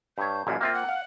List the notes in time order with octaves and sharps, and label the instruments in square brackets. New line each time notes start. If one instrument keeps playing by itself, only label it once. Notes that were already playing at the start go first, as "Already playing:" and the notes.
[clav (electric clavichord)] G2 C#5 [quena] G6
[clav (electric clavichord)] A1 F#2 A#2 [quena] G#6
[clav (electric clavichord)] A#3 C4 F4 [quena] E5
[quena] F#5
[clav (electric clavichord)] F5